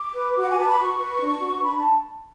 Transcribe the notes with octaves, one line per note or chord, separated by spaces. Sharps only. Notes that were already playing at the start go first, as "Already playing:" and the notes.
Already playing: D6
B4
F#4
F#5
G#5
B4 A5
B5
F#4 C#6
B4
D4
F#4 B4
D4 B5
A5